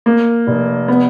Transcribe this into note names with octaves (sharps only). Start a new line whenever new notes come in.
A#3
F1
B3